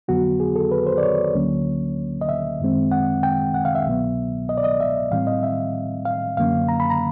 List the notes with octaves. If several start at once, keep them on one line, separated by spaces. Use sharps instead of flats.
F2 D3 F#3 B3 F#4
G#4
A4
B4
C5
D5
C#5
D2 D3 F#3 A#3 C#4
D#5
E5
F#2 D#3 G#3 C4
F#5
G5
F#5
F5
E5
C2 B2 F#3 B3
D#5
D5
D#5
E5
A2 E3 G3 C4 F5
D#5
E5
F5
F#2 D3 F#3 A#3 C#4 F5
A#5
B5
A#5